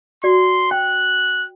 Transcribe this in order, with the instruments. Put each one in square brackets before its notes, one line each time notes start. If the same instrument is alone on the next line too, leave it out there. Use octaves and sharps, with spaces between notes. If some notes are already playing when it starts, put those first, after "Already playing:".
[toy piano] F#4 D5 [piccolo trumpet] C6
[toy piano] G5 [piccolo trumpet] F#6